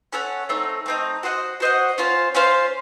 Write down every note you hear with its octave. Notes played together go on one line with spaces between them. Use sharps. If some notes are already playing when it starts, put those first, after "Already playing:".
C#4 A4 C#5 F#5
A3 C4 D#4
A3 C4 D#4
F#4 C5 D#5 F#5
F#4 C5 D#5 F#5
C#4 F4 C5 F5
C#4 F4 C5 F5